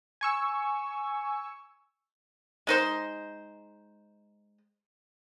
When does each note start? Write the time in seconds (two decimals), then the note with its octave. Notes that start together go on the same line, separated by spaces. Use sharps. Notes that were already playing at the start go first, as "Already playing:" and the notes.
0.21 G#5 C#6 E6
2.67 G#3 D#4 C5